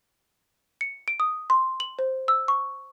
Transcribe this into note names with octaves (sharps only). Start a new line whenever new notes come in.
C#7
D7
D#6
C6
F#7
C5
E6
C#6